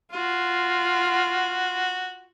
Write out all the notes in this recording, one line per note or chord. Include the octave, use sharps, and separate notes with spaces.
F4 F#4